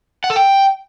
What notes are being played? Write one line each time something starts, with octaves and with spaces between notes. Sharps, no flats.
F#5
A4
G5